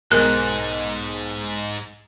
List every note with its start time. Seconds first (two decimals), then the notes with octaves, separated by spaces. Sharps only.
0.12 B1 G#2 G#3 A#4 F#6